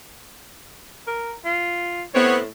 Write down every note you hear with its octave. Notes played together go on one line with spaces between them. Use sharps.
A#4
F4
A2 B3 C4 C#5